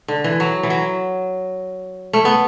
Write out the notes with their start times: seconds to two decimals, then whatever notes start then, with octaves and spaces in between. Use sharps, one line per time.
0.08 D3
0.24 E3
0.40 F#3
0.63 E3
0.70 F#3
2.13 A3
2.25 B3